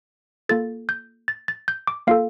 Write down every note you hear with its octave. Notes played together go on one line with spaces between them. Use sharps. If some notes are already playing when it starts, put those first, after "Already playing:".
A#3 F4 A4 A6
G6
A6
A6
G6
D6
A#3 F4 A4 F5